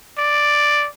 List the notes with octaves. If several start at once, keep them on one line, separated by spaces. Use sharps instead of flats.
D5